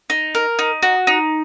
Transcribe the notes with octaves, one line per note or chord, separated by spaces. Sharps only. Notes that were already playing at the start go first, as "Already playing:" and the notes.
D#4
A#4
D#4
F#4
D#4